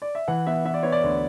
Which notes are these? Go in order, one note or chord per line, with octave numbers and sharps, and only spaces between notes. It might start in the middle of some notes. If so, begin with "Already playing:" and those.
D5
E5
E3 F#5
B3 E5
B3 E5
D5
B3 C#5
D5
D2